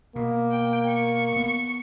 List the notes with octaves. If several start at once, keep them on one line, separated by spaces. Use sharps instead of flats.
B2 A#3
G5
C#6
B3